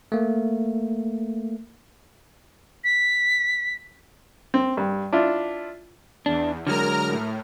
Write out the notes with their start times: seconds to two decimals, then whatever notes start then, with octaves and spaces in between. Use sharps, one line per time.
0.12 A3 A#3
2.84 B6
4.54 C4
4.77 G2
5.12 D4 E4 F4
6.26 E2 D4
6.67 D3 F#3 G#3 A#4 A#5 F6
7.07 A2